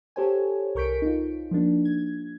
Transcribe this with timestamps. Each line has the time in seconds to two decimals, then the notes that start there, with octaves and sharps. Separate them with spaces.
0.16 G4 A4 C5 C#5 G#5
0.75 C2 A#4 C#6 G6 B6 D7
1.02 D#4 F4
1.51 F3 A#3 D4
1.85 G#6